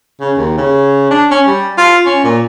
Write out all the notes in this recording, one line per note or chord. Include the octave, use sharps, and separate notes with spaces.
C#3
D#2
C#3
D4
C#4
G3
F4
C#4
A#2